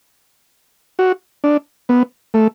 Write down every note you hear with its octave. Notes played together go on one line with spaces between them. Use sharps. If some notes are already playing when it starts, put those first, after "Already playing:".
F#4
D4
B3
A3